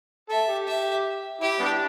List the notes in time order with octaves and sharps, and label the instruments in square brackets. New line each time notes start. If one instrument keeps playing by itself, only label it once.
[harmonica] A4 [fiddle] E5
[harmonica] G4
[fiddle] E5
[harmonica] E4 [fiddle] G4
[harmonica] G3 B3 D4